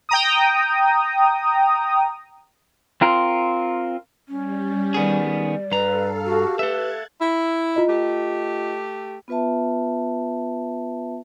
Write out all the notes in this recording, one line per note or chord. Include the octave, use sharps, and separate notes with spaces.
G5 A#5 D#6
C4 F4 A#4
G3 C#4
D#3 B3 G#4 D5
G2 A4 B4 F5 A#5
F#4 G4
A4 B4 E5 F#6 G#6 A6
E4
F4 D#5
A3 G4
B3 F4 B4 E5 A5